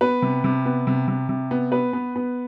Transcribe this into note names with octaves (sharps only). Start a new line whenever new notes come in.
B3 B4
C3
C3
B3
C3
C3
C3
B3
B3 B4
B3
B3